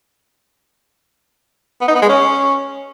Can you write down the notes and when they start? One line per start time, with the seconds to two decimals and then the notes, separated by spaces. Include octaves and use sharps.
1.81 B3
1.88 D#4
1.95 B3
2.02 G#3
2.09 C#4